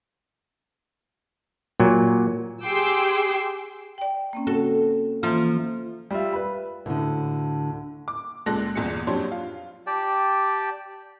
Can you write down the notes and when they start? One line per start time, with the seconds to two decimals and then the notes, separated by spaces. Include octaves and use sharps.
1.80 A#2 F#3
2.63 G4 G#4 G5 C6 D6 E6
3.98 D5 G5
4.33 A#3 C4 C#4
4.47 C#3 F#4 A4
5.23 E3 F3 A#3 F4
6.11 G3 F4 E5
6.33 B4 B5
6.86 D2 A2 D3
8.08 D6
8.46 C#2 A#2 G#3 A4 F#6 A#6
8.75 G1 E2 A#2 G#4 C#7
9.07 F2 F#3 D4 G4 C#5 C6
9.31 F4
9.87 G4 D5 G5 A5